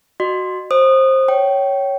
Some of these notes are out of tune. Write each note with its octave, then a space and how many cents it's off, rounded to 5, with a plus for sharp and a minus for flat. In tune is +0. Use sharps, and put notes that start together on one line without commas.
F#4 +0 D#5 -25 C6 +0
C5 +20 D#6 -20
C#5 +0 G5 -25